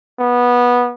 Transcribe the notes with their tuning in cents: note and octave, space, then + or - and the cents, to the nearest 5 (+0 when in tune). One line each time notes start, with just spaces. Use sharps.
B3 -15